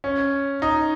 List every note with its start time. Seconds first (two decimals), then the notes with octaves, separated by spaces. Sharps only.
0.04 C#4
0.62 D#4